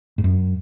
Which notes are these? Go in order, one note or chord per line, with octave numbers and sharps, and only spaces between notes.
G#2
F#2